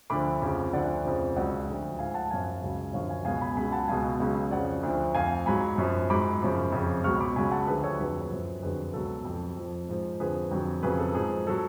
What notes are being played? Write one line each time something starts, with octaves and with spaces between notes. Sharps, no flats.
D2 D3 F3 B5 D6
F2 C#3 F3
D2 D3 F3 D5 F#5
F2 C#3 F3
C#2 C#3 F#3 D5 F#5
D2 D3 F3
G#2 F3 F5 G#5
F#5 A5
F#2 F3 F5 G#5
C#2 C#3 F#3
F#2 D3 F3 C#5 F5
F5 G#5
C#2 B2 F#3 F5 G#5
G#5 B5
C#2 C#3 F#3 G#5 B5
F#5 A5
C#2 B2 F#3 F5 G#5
C#2 C#3 F#3
F2 C#3 F3 D5 F#5
D2 D3 F3
F2 F3 F5 G#5
G#2 F#3 G#5 B5
F#2 F3
G#2 F#3 B5 D6
F#2 C#3 F3
F2 C#3 F3
C#2 B2 F#3 C#6 F6
B5 D6
C#2 C#3 F#3 G#5 B5
F#5 A5
D2 D3 F3 G#4 B4
A4 C#5
F2 D3 F#3 G#4 B4
F#2 F3
F2 D3 F#3 G#4 B4
C#2 B2 F#3 A4
F2 F3
F2 F3
G#2 F3
F2 D3 F3 G#4 B4
F2 D3 F#3
F2 C#3 F#3 G#4 B4
A4
G#2 F3 G#4
F#3 A4